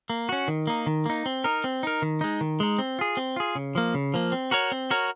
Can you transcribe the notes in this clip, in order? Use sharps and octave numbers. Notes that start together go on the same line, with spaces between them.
A#3
C#4 F#4
D#3
A#3 D#4
D#3
A#3 D#4
C4
D#4 A#4
C4
D#4 A#4
D#3
G#3 D#4
D#3
G#3 D#4
C4
F4 G#4
C4
F4 G#4
C#3
F3 A#3
C#3
F3 A#3
C4
F#4 A#4 C#5
C4
F#4 A#4 C#5